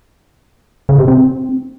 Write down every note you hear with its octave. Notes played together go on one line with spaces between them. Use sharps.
C#3
C3
C4